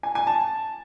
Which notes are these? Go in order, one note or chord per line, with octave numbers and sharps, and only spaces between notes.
G#5
G#5
A5